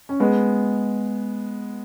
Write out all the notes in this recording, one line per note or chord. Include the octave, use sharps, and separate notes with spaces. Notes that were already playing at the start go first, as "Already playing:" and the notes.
C#4
G#3 B3